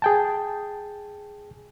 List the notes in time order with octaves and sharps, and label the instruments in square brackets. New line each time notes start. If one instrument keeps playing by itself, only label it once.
[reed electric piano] G#4 G5 A5